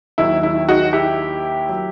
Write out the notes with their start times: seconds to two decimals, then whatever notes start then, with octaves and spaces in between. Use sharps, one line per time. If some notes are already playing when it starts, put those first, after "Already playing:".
0.18 D#2 D#3 F#3 E4
0.43 E4
0.69 D#4 F#4
0.93 E4 G4
1.69 F#3